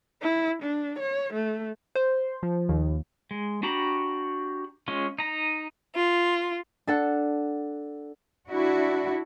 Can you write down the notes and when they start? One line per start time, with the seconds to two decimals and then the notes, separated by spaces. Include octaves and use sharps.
0.22 E4
0.63 D4
1.00 C#5
1.34 A3
1.95 C5
2.43 F3
2.69 D#2
3.31 G#3
3.63 D4 F#4 G4 A#5 B5
4.88 G#3 C#4 F4
5.19 D#4 A#5
5.95 F4
6.87 D4 A4 F#5
8.49 D4 E4 F#4